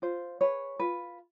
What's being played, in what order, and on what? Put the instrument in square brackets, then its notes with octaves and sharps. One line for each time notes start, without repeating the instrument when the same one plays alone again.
[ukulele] F4 C5
G#4 B4 C#5
F4 B4